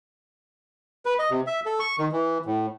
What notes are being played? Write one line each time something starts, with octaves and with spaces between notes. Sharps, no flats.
B4
D#5
C3
E5
A4
C#6
D#3
E3
A2